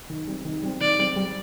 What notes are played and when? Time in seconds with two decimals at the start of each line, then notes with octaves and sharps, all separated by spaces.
0.10 D#3
0.27 G3 C4
0.45 D#3
0.62 G3 C4
0.80 D#3 D5
0.99 G3 C4
1.16 G3